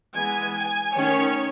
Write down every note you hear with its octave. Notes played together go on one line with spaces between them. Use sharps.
E3 G#3 B3 G#5
G#5
D#3 A3 C#4 C#5